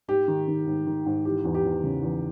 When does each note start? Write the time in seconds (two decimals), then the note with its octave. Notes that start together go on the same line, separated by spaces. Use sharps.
0.08 G#2 G4
0.28 D#3
0.48 D#3
0.66 G#2
0.87 D#3
1.06 G#2
1.25 E3 G4
1.45 E2
1.54 G4
1.65 E2
1.84 C#3
2.03 E2